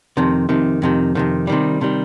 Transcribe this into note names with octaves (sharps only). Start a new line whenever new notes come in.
F2 C3 D#3
F2 C3 D#3
F2 C3 D#3
F2 C3 D#3
C3 D#3 G3
C3 D#3 G3